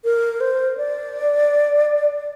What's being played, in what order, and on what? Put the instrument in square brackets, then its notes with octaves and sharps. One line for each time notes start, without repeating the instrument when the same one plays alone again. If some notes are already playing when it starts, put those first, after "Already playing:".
[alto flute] A#4
C5
D5